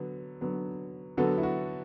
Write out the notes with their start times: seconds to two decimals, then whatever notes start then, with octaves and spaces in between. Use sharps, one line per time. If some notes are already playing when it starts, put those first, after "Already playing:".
Already playing: D3 F#3 B3
0.41 D3 F#3 B3
1.17 D3 F#3 B3 F#4 A4
1.38 E4
1.43 F#4